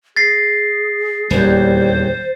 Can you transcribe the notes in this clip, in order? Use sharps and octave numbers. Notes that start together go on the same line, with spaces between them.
G#4 A6 A#6 C7
D#1 E2 G3 C5